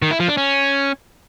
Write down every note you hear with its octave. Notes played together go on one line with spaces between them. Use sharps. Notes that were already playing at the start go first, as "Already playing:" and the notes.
D#3
E4
F3
D4
C#4